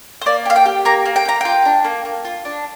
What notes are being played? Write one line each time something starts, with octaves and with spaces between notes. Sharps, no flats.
C5
A#3 D5
G4 F5
G5
G4
A#3 A#5
A#3
G5
G4 A#5
F4 G5
D4
A#3
A#3
F4
D4